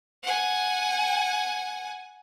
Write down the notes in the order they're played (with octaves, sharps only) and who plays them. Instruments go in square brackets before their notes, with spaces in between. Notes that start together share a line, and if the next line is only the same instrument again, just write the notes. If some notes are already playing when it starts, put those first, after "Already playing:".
[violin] F#5 G#5